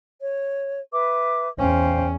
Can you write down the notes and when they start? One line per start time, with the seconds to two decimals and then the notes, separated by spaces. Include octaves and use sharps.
0.21 C#5
0.91 B4 E5 D6
1.59 E2 C#4 C5 F5 G5